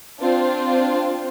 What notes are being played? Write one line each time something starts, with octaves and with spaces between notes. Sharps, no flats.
C4 D4 F4